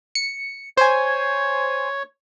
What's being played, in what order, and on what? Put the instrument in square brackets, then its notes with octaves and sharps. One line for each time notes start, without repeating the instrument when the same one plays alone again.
[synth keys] C#7
[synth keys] C5 G#5 [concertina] C#5